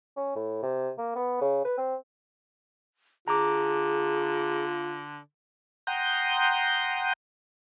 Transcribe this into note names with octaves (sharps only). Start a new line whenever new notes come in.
C#4
A2
C3
A#3
B3
C#3
B4
C4
D3 F4 G#4 A#5 D6
F#5 G5 A#5 C6 D#6 G6